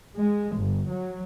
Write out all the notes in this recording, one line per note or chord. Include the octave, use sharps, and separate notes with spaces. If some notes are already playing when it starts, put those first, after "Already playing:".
G#3
G1
F#3